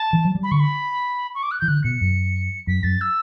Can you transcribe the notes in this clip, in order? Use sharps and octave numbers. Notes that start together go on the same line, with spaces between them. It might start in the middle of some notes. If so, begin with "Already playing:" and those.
Already playing: A5
E3
F#3
G3
B5
D3 C#6
B5
C#6
D6
F#6
E3 G6
D3 F#6
B2 C#7
F#2
F#2 B6
F#2 A6
E6